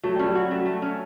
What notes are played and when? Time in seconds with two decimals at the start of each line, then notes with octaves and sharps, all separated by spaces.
0.03 F#3 A3
0.15 G3 C#4
0.25 F#3
0.35 F#4
0.51 A3
0.66 A3
0.82 C#4